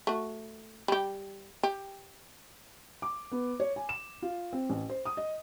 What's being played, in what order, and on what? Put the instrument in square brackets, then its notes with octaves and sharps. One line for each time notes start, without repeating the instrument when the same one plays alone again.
[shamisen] A3 F#4
G3 G4
G4
[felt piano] D6
B3
C#5
G#5
E7
F4
C4
A1
C5
D#6
D#5